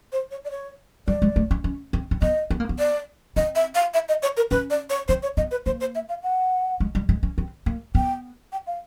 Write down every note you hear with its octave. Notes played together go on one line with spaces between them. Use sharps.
C5
C#5
D5
C#5
G3 D5
G#3
A3
C#4
C#4
C4
C4
B3 D#5
B3
A#3
B3
D5
C4 D#5
E5
F5
E5
D#5
C#5
A#4
C#4 B4
D5
C#5
C4 C5
C#5
B3 D#5
B4
A#3 C5
C5
E5
F5
F#5
G#3
G3
G#3
C#4
C4
A#3
B3 G5
G5
F5